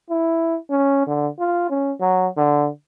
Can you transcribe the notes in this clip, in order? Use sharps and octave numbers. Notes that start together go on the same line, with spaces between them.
E4
C#4
D3
F4
C#4
F#3
D3